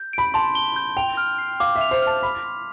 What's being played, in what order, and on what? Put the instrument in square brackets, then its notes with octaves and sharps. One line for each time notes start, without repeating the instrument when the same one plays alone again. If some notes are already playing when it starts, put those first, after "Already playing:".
Already playing: [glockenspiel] G6
[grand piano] B5 [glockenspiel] D7
[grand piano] A5 [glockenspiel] C6
[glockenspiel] G7
G6
[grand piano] G5 [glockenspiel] F7
[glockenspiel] F6
C7
[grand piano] F5 [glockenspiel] D6
[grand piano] E5
[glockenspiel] F7
[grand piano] C5
[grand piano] A5 [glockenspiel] F6
[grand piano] B5 [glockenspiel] B6
[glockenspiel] C6